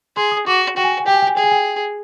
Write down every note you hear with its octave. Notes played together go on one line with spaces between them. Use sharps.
G#4 C6
D#6
F#4 D6
F#4 G5
G#5
G5
G#5
G4 G5
G#5
G5
G#5
G#4 G5
G#5
G5